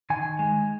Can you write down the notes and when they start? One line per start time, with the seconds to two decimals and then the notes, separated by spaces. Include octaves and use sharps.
0.10 D#3 G#5
0.39 G#3